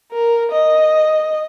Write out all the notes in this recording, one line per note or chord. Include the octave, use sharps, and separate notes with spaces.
A#4
D#5